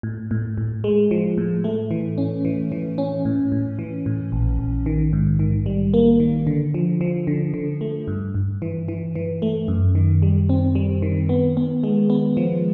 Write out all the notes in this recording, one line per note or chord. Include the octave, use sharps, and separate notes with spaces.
A2
A2
A2
G#3
F3
A2
A3
E3
C#4
E3
E3
C#4
A2
A2
E3
A2
A#1
A#1
D#3
G#2
D#3
G3
A#3
D#3
D3
F3
F3
D3
D3
A3
G2
G2
E3
E3
E3
A3
F#2
D#3
G3
C4
G3
D#3
B3
B3
G#3
B3
F3